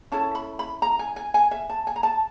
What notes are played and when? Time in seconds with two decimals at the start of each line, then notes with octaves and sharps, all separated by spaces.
0.12 C#4 E4 A4 A5
0.35 B5
0.59 B5
0.82 A#5
0.99 G#5
1.16 G#5
1.34 G#5
1.51 E5
1.69 A5
1.87 G#5
1.96 A#5
2.03 A5